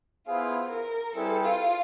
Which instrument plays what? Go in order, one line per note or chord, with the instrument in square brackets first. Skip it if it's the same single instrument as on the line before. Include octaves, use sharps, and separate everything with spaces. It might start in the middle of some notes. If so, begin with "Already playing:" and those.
[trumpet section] B3 E4 G#4 C5 F5 [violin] F4
[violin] A#4
[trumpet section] G3 C4 E4 G#4 B4 [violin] A4
[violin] F4